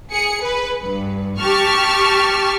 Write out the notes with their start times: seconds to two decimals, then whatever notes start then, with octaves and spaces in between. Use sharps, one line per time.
0.12 G#4 C#7
0.42 B4
0.83 G2
1.40 G4 A5 C#6 F6